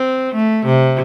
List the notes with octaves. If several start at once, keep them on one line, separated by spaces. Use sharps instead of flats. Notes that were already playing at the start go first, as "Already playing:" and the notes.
Already playing: C4
A3
C3